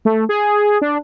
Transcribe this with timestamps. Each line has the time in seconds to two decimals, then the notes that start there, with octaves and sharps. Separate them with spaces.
0.05 A3
0.29 G#4
0.82 D4